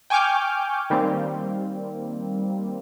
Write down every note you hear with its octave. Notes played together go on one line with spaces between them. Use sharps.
G5 G#5 C#6 D6 F6 G6
D#3 G3 A#3 C4